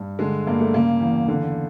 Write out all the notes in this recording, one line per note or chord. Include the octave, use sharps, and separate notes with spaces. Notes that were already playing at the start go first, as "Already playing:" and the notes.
Already playing: G2
D3 G#3
G2 A#3
A3
C#3 A#3
E2
D3